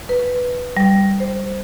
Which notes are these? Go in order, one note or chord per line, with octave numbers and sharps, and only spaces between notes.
B4
G3
C5